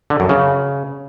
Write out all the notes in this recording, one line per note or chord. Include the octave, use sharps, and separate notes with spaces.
D3
F#2
C#3